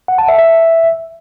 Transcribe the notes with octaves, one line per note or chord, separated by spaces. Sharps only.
F#5
A5
E5
E5